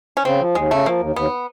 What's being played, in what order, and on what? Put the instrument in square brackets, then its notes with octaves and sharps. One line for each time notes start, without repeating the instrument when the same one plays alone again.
[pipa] C#4
[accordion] C#3 [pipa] C4
[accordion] F3
[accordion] D#2 [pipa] G#3
[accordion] C#3 [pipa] A3
[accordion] F3 [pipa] A#3
[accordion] D#2
[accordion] D#2 [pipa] B3